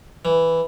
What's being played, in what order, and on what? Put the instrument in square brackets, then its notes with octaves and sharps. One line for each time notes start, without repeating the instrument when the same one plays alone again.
[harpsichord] E3